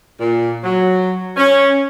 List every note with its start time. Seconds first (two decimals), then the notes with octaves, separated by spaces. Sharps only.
0.20 A#2
0.64 F#3
1.37 C#4